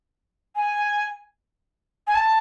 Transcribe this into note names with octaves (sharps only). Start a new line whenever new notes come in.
G#5
G#5
A5